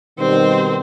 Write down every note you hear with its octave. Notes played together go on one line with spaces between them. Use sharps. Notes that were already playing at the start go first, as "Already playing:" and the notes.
B2 D#3 G3 C4 C5